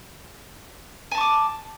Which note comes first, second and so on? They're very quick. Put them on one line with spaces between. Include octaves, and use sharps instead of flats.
G#5 A5 C#6 D6